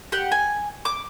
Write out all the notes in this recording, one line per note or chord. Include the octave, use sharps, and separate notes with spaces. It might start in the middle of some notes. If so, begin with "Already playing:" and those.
G4 F#5
G#5
D6